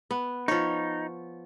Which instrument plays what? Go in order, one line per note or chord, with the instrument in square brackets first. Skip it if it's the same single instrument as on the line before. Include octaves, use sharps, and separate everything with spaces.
[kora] B3
[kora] F3 C#5 [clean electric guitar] D#4